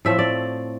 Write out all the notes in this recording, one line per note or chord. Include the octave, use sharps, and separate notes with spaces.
A2 F3 A3 C4 E5
D5